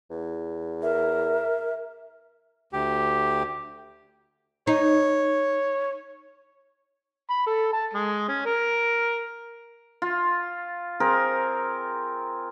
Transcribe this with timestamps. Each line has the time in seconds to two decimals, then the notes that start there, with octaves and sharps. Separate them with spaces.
0.10 E2
0.82 A#4 E5
2.73 D2 G4
4.67 D#4 C#5
7.30 B5
7.47 A4
7.73 A5
7.94 G#3
8.28 C#4
8.46 A#4
10.02 F4
11.00 C4 G#4 A#4